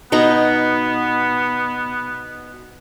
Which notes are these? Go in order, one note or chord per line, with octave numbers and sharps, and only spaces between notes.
B2 B3 D#4 A#5